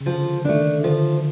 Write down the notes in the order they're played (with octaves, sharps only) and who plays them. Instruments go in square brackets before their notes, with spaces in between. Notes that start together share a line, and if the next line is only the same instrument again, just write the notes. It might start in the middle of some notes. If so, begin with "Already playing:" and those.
[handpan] C#3
[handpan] D3 [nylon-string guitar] F3
[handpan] D#3 [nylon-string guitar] A3 D4
[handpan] D3 [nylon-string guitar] F3